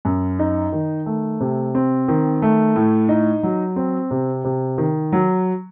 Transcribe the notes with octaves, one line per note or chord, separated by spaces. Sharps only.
F#2
D#4
D#3
A3
C3
C4
D#3
A3
A2
D#4
F#3
C4
C3
C3
D#3
F#3